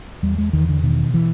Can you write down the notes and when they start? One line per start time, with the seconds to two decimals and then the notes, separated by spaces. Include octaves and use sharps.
0.23 E2 G3
0.38 G#3
0.53 E2 D#3
0.69 D3
0.83 B2 D#3
1.14 E3